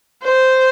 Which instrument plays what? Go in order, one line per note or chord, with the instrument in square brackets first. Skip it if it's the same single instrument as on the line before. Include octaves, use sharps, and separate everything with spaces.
[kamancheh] C5